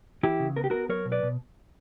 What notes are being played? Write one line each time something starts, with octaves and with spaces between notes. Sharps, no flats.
E3 E4 G4
C#3
B3 A#4
G4
B3 F#4 A#4
F#3 A#4 C#5
B2
B4 D5
B2